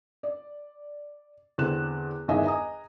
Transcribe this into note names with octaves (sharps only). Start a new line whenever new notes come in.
D5
E2 D3 C4 F#6 E7
G1 E2 D#3 D#5 E5 G#5
D#5 G#5 A#5 D#6